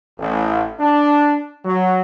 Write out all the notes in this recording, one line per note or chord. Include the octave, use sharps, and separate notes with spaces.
A1
D4
F#3